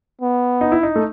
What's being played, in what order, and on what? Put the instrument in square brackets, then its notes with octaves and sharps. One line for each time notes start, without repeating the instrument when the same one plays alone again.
[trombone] B3
[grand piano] D#4
E4
D#4
A3